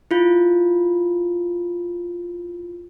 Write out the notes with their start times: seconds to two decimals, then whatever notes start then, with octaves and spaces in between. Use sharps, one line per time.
0.11 E4 F4